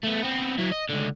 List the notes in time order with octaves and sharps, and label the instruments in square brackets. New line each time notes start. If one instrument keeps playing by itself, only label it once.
[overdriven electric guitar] A3 B3
B3 C4
F#3 E4
D#5
C#2 D3